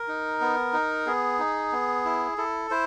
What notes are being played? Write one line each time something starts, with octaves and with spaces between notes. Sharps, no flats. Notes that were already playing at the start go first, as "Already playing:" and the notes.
Already playing: A#4
D#4
B3
D#4
B3 G#4
D#4
B3
E4
E4 A4
E4 C5